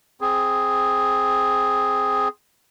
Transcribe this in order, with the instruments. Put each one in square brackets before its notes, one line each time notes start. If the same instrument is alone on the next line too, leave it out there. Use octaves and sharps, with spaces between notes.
[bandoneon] C4 G#4